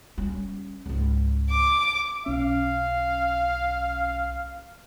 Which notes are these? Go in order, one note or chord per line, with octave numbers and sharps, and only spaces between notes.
G3 C#4
C#2 G#2
D6
B1 C#4 F5